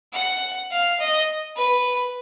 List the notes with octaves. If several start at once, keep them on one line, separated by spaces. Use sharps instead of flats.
F#5
F5
D#5
B4